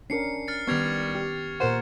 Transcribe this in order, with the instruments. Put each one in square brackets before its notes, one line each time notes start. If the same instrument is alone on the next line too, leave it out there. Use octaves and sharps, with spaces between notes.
[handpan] C#4 D4 A#4 [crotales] C7 C#7
[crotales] F6 A6 C#7
[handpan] D#3 B3 [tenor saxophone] G3 [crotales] C#6 G#6 F7
[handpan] G4
[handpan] A#2 A#4 F#5 [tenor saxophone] C5